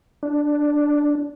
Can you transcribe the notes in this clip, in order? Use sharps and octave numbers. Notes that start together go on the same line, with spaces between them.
D4